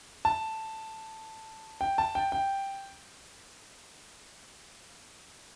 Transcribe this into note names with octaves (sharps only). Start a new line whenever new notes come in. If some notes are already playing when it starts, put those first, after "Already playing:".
A5
G5
A5
G5
G5